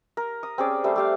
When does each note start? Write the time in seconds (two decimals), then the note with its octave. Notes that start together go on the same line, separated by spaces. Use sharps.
0.17 A#4
0.43 D#6
0.58 C4 C#4 G#4 D5
0.84 G3 A3 C5
0.96 A3 G4 F5